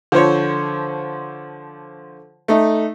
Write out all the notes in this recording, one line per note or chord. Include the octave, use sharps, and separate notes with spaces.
D3 F3 C5 C#5
A3 D#4